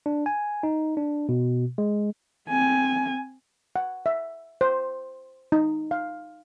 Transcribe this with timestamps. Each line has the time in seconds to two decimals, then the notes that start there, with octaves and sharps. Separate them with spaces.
0.06 D4
0.26 G#5
0.63 D#4
0.97 D4
1.29 B2
1.78 G#3
2.49 C4 G#5
3.76 F#5
4.06 E5
4.61 C5
5.52 D#4
5.91 F5